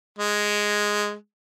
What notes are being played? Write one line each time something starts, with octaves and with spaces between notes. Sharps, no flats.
G#3